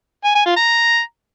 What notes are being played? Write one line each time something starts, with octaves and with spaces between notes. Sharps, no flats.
G#5
G#5
F4
A#5